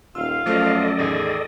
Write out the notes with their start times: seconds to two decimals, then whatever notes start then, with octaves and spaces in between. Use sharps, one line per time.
0.15 D#1 F4 F5 E6
0.46 F#2 F3 A3 A4 C5 D5 D#5
0.99 E2 A2 D#3 G#4